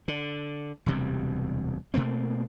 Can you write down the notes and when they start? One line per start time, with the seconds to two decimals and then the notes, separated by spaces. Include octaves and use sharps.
0.08 D3
0.86 E1 D2 C3 G3
1.94 B2 A3 A#3 C4